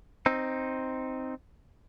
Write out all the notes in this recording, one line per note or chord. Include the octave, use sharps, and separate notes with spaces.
C4 D#4